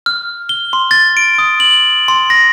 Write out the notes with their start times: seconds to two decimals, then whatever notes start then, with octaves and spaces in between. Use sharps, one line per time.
0.06 F6
0.49 G7
0.73 C6
0.91 A6
1.17 D7
1.38 D#6
1.60 F#7
2.08 C6
2.30 A#6